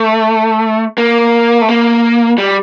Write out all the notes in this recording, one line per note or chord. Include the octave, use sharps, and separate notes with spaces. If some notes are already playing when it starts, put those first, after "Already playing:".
Already playing: A3
A#3
A3
A#3
G3